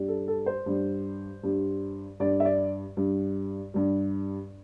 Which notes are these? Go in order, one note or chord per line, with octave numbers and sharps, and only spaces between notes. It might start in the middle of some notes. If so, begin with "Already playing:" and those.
Already playing: G2 G3
A4
A4
C5
G2 G3
G2 G3
G2 G3 D5
E5
D5
G2 G3
G2 G3